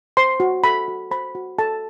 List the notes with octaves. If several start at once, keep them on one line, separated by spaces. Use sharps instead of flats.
C5 C6
F#4
A4 B5
F#4
C5 B5
F#4
A4 A5